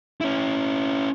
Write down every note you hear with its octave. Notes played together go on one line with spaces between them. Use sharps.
C#4 E4